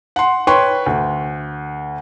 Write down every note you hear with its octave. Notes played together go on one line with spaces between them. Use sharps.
F#5 C6
B4 C#5 G5 C6 C#6
D2